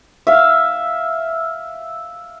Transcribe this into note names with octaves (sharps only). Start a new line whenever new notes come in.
E5 F5